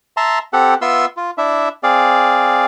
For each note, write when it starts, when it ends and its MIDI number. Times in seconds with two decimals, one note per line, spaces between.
0.17 0.39 76
0.17 0.39 81
0.17 0.39 82
0.17 0.39 84
0.53 0.74 60
0.53 0.74 67
0.53 0.74 69
0.53 0.74 78
0.81 1.06 59
0.81 1.06 65
0.81 1.06 76
0.81 1.06 84
0.81 1.06 88
1.17 1.31 65
1.38 1.69 62
1.38 1.69 64
1.38 1.69 76
1.83 2.66 60
1.83 2.66 68
1.83 2.66 74
1.83 2.66 77